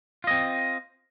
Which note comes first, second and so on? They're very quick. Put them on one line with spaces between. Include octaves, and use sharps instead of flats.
F4 D#5 C4